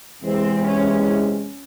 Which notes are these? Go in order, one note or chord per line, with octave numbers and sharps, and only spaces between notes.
E2 C3 E3 G#3 C4
C#4